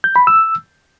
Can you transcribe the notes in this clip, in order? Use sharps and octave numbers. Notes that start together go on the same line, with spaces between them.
G6
B5
E6